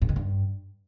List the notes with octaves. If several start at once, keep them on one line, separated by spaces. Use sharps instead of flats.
G2
D#3
G2